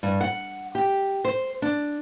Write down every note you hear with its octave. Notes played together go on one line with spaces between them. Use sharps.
G2
F#5
G4
C5
D4